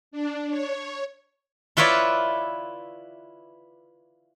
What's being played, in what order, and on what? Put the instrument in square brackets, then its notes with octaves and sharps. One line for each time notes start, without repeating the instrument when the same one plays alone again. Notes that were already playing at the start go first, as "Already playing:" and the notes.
[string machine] D4
C#5
[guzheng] E4 F4 B4 C#5 D5 E5